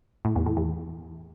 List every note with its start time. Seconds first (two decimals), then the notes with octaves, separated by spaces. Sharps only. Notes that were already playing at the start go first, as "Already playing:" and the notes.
0.25 A2
0.35 E2
0.46 A2
0.57 E2